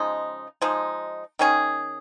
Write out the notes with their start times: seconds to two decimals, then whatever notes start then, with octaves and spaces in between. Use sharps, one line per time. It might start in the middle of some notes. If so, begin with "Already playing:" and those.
Already playing: C#3 F3 G#3 D#4
0.62 F3 G#3 D#4
1.39 D#3 C#4 G#4